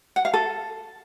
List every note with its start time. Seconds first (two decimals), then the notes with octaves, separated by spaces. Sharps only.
0.16 F#5
0.25 F5
0.34 A4